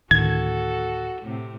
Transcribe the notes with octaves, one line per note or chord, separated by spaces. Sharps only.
D2 A2 D#3 F#4 A4 G#6
A2 C3